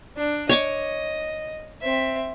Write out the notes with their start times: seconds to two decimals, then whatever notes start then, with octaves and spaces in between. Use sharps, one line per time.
0.17 D4
0.49 C#5 D#5 C#6 D6
1.82 C4 E5